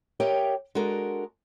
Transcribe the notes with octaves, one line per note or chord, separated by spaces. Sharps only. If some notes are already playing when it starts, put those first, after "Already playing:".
G4 A#4 C#5 D#5 E5 G5
G#3 D4 F#4 A4 A#4